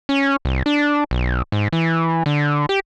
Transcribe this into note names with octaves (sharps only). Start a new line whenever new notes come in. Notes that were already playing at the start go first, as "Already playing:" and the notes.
C#4
C2
D4
B1
G#2
E3
D3
G4